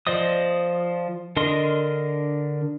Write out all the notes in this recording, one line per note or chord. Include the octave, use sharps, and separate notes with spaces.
F3 C5 D5 D#5 D#6
D3 D4 A#4 D#5 C6